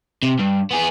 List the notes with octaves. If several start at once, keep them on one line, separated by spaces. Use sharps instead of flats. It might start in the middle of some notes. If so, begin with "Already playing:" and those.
C3
G2
B3 G#4